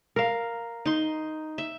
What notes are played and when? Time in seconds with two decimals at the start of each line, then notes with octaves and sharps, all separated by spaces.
0.16 A#4 F5
0.86 D#4 C6
1.58 E5